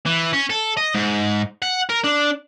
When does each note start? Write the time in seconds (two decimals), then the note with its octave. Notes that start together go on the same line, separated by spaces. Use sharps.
0.07 E3
0.33 C#4
0.50 A4
0.77 D#5
0.95 G#2
1.62 F#5
1.90 A#4
2.04 D4